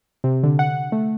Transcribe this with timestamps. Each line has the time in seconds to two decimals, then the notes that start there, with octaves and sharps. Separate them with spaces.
0.24 C3
0.43 D3
0.59 F#5
0.92 A3